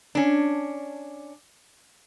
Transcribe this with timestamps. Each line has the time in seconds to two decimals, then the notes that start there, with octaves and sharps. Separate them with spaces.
0.15 C#4 D4